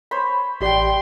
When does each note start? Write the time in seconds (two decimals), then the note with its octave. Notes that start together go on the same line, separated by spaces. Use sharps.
0.11 C5 C#5 B5
0.61 A1 G4 D5 G5 C6